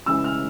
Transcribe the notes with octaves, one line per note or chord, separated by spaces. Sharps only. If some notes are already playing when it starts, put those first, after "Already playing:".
C#3 E3 G#3 E6
F6